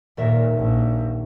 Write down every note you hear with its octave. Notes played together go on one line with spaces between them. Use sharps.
D#1 A#2 A#4 E5
A#1